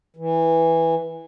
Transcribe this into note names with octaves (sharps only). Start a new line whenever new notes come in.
E3